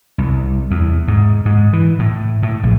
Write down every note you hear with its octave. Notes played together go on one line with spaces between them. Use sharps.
C2
E2
G#2
G#2
E3
A2
A2
A#1